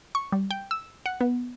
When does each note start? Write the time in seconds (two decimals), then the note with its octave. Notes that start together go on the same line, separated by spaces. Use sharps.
0.15 C#6
0.32 G3
0.51 G5
0.71 E6
1.06 F#5
1.21 B3